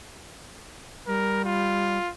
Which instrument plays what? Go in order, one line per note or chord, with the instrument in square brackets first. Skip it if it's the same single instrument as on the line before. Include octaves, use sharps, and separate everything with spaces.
[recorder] G3 [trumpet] A#4
[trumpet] F4